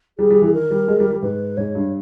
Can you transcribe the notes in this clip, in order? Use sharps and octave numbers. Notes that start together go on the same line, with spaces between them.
G3 G#4
G3
E3 G#4
D#3 A#4
G3
G#3
G3
G3
G#2 B4
G#2 C#5
G2